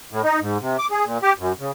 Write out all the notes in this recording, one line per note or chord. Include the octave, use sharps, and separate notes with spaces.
A2
D#4
G#2
C3
D6
G#4
A#2
G4
F#2
C#3